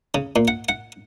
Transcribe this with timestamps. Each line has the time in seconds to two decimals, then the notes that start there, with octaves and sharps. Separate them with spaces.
0.14 C#3
0.36 A#2
0.48 F#5
0.69 F#5